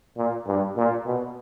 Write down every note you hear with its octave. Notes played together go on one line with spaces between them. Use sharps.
A#2
G2
A#2
B2